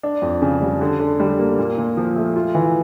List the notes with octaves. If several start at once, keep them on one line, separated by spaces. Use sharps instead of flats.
D4
F2
C#3
G3
D3
D3
G3
A#3
A#2
A#2
F3
A3
F4
E3